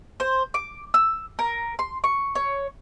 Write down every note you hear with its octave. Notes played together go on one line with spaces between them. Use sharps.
C5
D6
E6
A#4
C6
C#6
C#5